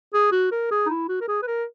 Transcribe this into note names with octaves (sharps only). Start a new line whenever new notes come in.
G#4
F#4
A#4
G#4
D#4
E4
F#4
A#4
G#4
B4
A#4